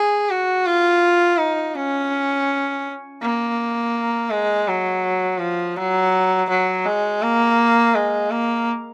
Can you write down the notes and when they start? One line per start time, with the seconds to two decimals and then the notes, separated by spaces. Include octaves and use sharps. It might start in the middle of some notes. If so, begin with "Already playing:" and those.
Already playing: G#4
0.30 F#4
0.66 F4
1.39 D#4
1.76 C#4
3.22 A#3
4.30 G#3
4.68 F#3
5.40 F3
5.76 F#3
6.49 F#3
6.85 G#3
7.22 A#3
7.94 G#3
8.31 A#3